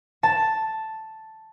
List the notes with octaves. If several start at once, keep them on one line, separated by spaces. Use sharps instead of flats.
A5